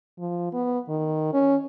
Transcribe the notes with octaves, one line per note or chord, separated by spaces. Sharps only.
F3
B3
D#3
C#4